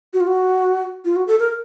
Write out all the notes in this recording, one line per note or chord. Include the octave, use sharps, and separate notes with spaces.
F#4
F4
F#4
F4
F#4
A4
A#4